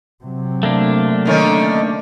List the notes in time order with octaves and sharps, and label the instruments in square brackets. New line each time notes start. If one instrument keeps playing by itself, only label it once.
[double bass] C3 F#3
[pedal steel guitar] A3 A#3 D4
[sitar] D3 D#3 C#4